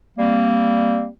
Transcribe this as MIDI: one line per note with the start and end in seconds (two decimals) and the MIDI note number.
0.18 1.07 55
0.18 1.07 58
0.18 1.07 60